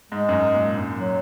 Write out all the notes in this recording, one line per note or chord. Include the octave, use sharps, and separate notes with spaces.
G#2 G#3
F#2
G#2
A#2
F#2
F#3